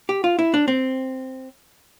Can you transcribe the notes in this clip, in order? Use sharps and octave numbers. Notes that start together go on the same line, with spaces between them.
G4
F4
E4
D4
C4